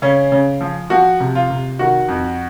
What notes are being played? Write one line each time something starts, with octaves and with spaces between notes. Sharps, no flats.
C#3 C#4
C#3
F3
F3 F#4
C3
F4
C3
D#3 F#4
F2